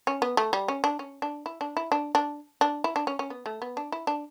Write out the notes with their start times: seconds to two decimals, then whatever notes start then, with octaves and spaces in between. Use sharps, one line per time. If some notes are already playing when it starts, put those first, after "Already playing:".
0.07 C#4
0.22 B3
0.37 A3
0.53 G3
0.68 C#4
0.84 D4
0.99 C#4
1.22 D4
1.46 E4
1.61 D4
1.77 E4
1.92 D4
2.15 D4
2.61 D4
2.84 E4
2.96 D4
3.07 C#4
3.19 C#4
3.30 B3
3.46 A3
3.62 B3
3.77 D4
3.92 E4
4.07 D4